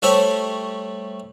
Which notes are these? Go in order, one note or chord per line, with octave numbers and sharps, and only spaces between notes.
G3 A3 E4 G4 C5 C#5